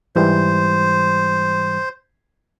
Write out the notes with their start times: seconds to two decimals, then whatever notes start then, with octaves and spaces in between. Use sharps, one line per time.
0.16 G#2 E3 G3 C5